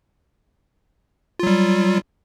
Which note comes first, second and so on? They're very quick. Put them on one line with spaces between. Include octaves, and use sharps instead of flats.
F4 F#3 G3